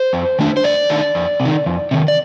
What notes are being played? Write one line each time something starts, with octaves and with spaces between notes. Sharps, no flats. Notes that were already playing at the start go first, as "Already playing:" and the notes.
Already playing: C5
F2
D#3 A3 D4
C5
F2 D5
D#3 A3 D4
F2
C3
D#3
F2
C3 D#3
D5